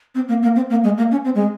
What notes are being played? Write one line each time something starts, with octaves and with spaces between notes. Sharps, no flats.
C4
A#3
A#3
C4
A#3
G#3
A#3
C#4
C4
G#3